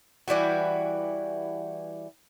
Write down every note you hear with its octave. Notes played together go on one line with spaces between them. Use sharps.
E3 G3 E4 F#4